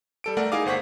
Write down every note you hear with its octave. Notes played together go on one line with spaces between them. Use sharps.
G3 A4 D7
A3 A#4 D5 F#5
D#4 E4 G#4 A#4 F5 D6
G1 C5 F#5 C#6 B6